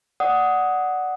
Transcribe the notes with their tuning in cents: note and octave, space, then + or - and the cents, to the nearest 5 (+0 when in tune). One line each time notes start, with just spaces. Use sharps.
D5 +0 F#5 +0 D#6 +10